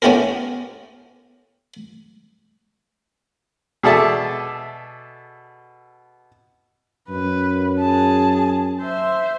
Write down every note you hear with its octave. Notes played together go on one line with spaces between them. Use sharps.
B3 C#4 E4 G4 A4 A#4
B2 G#4 A4 D5 E5 A5
F#2 B4
G#4 A5
C5 E5